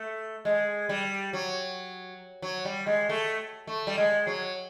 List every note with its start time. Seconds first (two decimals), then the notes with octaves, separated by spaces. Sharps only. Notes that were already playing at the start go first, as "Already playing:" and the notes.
Already playing: A3
0.45 G#3
0.89 G3
1.33 F#3
2.42 F#3
2.65 G3
2.87 G#3
3.09 A3
3.67 A3
3.87 G3
3.97 G#3
4.27 F#3